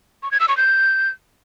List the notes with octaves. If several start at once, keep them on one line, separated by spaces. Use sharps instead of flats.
C#6
G#6
E6
C#6
G6